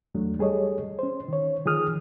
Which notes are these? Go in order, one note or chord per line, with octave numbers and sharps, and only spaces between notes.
E2 F#3 A3 D4
G3 G#4 A4 C#5 D#5
C#4 C5
D#3 C#5
D#3 F3 G#4 D#6 F6